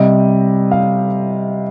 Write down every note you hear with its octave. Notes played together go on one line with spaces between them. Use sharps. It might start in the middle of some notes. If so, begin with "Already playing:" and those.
Already playing: C3 G3 D#5
F5